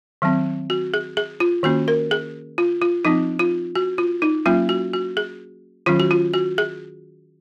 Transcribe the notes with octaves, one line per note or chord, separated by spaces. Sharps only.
D#3 F#3 C4
F#4
G#4
G#4
F4
D#3 A#3 C#4 F#4
A#4
G#4
F4
F4
F3 C4 D#4
F4
F#4
F4
D#4
F#3 A#3 C#4 F4
F#4
F#4
G#4
D#3 F#3 C#4 F4
F#4
F4
F#4
G#4